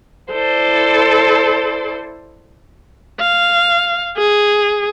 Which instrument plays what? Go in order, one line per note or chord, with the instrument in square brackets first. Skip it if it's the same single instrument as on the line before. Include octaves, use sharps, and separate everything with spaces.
[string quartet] E4 A4 C5 D5
[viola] F5
G#4